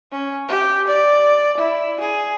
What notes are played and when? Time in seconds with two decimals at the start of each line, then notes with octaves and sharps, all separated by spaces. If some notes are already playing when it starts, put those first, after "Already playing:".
0.12 C#4
0.48 G4
0.87 D5
1.57 E4
2.00 G#4